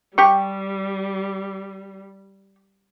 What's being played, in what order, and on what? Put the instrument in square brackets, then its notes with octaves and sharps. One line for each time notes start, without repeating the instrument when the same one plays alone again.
[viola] G3 [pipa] G4 C#6